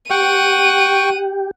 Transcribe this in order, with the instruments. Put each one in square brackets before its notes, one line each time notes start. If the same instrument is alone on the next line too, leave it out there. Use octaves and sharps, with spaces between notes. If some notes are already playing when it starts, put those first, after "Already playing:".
[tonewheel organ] G4 [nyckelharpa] F#5 [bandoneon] G5 C#6 [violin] D#7